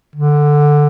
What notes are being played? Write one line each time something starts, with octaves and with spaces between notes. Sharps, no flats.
D3